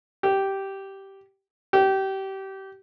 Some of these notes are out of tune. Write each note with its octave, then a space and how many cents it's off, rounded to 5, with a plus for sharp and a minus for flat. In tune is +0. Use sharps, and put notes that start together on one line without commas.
G4 -10
G4 -25